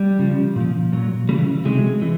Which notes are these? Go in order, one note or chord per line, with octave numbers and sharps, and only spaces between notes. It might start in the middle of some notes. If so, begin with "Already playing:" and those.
Already playing: G3
C#3 F3
A#2 F3
A#2 F#3
C#3 E3 G3
C3 D#3 F#3 G#3
E3